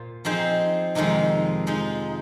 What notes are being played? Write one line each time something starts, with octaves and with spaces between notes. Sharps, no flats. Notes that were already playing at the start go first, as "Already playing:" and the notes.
Already playing: A#2 F4 C5
F3 C4 D#4 G#4 C5
F2 C3 D#3 G#3 D#4
F3 G#3 D#4